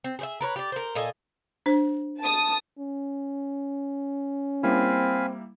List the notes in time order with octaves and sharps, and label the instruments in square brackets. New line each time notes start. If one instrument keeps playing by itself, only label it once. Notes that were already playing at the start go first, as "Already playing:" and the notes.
[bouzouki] C4
G#4 C5 E5
A#4 B4 C#5
G4 D5
A#4 C5
A#2 A4 D#5 G#5
[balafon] D4 C5
[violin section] A5 D#6
[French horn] C#4
[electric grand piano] G3 A#3 E4 [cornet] C4 [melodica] F5 G#5 B5